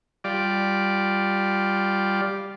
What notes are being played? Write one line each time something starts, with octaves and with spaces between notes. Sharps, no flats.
G3 F4 D5